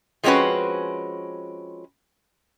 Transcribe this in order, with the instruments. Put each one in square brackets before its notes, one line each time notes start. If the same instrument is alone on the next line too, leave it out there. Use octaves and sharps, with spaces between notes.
[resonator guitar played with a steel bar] F3 G#3 C4 C#4 F#4 B4